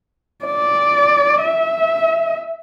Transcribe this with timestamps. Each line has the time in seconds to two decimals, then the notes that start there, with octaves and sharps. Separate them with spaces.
0.45 D5
1.42 E5